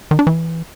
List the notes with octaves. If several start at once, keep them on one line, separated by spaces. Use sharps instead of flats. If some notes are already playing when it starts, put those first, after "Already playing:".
D#3
D4
E3